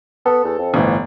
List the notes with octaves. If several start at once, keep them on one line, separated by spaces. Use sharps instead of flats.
B3 A4
E2
F2
G1 A2 E3